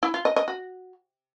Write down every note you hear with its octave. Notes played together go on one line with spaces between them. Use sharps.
E4
F4
D#5
D#5
F#4